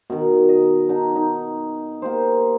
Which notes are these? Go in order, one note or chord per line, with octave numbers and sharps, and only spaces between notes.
B2 D#3
D#5
D#4 F#5 A5
D#4
A#3 G4 C5